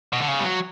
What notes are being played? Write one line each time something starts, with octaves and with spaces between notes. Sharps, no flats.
B2
D3
C#3
G3
F#3